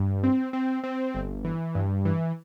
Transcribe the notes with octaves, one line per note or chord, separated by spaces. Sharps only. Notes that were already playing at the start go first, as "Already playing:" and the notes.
Already playing: G2
C4
C4
C4
G1
E3
G2
E3